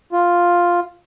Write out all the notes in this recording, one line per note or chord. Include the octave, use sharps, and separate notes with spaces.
F4